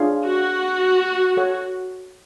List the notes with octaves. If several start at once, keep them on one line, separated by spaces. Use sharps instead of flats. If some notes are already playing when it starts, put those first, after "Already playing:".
Already playing: D4 F4 G#4 C#5 F5
F#4
A4 C#5 F#5